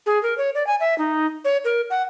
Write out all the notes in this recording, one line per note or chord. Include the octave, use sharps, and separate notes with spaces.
G#4
A#4
C#5
D5
G#5
E5
D#4
C#5
A#4
F#5